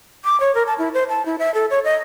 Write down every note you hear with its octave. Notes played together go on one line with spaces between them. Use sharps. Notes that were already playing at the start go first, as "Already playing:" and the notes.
D6
C#5
A#4
A5
E4
C5
A5
E4
E5
A4
C#5
D#5